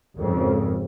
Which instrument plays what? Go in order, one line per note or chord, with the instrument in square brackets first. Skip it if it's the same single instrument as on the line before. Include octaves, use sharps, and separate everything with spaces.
[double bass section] G#1 F2 C#3